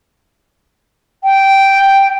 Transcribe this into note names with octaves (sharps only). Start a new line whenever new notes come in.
G5